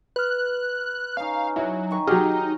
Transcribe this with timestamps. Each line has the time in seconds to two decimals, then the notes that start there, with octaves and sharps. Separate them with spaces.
0.16 B4 F6 F#6
1.17 C#4 D#4 F5
1.56 F#3 E4
1.91 D#3 C#6
2.07 F#3 D#4 G4 G#4 G5 A#5 F6